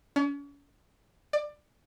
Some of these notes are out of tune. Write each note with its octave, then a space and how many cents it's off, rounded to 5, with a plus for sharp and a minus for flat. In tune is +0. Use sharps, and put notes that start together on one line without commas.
C#4 +40
D5 +20